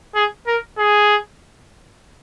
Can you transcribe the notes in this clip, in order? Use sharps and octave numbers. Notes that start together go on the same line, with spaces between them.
G#4
A#4
G#4